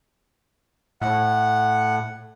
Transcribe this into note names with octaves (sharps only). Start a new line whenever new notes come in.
A2 F#5